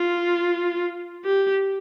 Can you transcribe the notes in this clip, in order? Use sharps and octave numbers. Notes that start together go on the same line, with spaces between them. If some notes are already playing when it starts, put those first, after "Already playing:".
Already playing: F4
G4